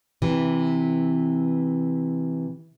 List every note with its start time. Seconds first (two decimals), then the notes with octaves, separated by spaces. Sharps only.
0.22 C3 E3